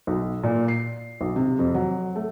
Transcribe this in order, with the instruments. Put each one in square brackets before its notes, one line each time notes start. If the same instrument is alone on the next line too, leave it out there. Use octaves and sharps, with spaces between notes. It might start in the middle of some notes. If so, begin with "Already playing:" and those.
[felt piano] B1
A#2
C7
B1
C3
F2
F#3
A3